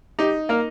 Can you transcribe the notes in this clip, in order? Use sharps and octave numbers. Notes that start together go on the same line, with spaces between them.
D#4 G4
A#3 A#4